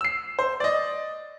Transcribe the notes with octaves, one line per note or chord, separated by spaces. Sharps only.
E6 C7
C5
D5 D#5